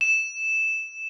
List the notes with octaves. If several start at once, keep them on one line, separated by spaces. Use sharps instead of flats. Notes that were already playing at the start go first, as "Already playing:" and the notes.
E7